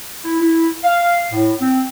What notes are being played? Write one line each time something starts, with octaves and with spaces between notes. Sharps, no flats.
E4
E4
F5
A2
C4